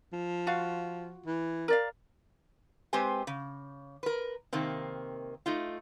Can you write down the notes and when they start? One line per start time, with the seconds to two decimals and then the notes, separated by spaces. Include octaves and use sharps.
0.13 F3
0.47 F4 F#4 F5
1.26 E3
1.68 A#4 D5 F5
2.93 G#3 C4 G4 B4 C5 G#5
3.27 C#3
4.03 A#4 B4
4.53 C3 D#3 A#3 C4
5.46 A3 D#4 F4